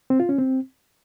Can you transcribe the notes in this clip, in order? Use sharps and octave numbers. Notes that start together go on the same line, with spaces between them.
C4
F4
C#4
C4